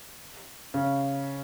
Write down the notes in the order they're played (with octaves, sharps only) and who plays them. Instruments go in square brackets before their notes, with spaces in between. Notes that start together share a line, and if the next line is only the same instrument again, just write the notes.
[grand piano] C#3